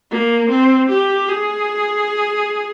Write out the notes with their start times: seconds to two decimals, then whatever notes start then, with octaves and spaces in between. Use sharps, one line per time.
0.11 A#3
0.50 C4
0.90 G4
1.28 G#4